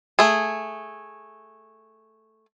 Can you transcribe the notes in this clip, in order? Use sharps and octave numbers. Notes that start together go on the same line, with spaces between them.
A3 G#4